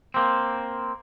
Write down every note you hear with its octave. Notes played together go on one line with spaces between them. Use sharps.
A#3 C4